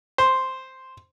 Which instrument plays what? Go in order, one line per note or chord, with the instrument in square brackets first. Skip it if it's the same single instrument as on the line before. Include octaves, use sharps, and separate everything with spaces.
[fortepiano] C5